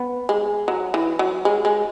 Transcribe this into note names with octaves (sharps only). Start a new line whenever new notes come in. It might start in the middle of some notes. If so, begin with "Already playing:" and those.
Already playing: B3
G#3
F#3
E3
F#3
G#3
G#3